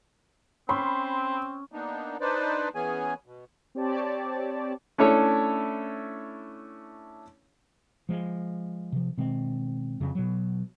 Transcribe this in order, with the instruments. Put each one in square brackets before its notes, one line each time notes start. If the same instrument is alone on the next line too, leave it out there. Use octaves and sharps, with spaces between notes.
[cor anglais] C4 [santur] C#4 [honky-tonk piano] B5 C6
[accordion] A#3 B3 D4 D#4
D4 D#4 B4 C5 D5
E3 B3 C#4 G#4 G#5
B2
[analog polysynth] C4 G4 C#5 D5 A5
[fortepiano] A3 C#4 D4 E4 A4 C#5
[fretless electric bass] F3 G#3
C3 F3
B2 D#3 G#3 C4
F2 C#3
B2 F#3